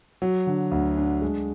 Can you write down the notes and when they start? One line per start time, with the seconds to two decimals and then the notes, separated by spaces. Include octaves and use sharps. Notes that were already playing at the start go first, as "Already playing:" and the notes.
0.22 F#3
0.47 D3
0.71 D2
0.97 D4
1.22 G#3